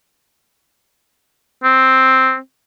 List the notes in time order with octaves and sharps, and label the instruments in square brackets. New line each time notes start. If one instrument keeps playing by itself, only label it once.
[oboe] C4